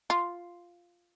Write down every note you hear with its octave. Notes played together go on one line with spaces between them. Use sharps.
F4